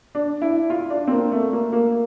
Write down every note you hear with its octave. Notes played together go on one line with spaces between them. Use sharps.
D4
E4
F4
D4
C4
A#3
A3
A#3
A#3